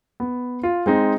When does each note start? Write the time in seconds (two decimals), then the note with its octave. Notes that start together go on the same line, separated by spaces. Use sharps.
0.20 B3
0.63 F4
0.86 G#3 C4 D#4